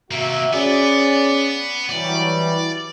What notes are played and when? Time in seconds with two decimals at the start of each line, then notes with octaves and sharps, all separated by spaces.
0.11 C3 A#3 F#4 E5
0.53 B3 C#4 G#4 D5
1.89 E3 F#3 G3 D5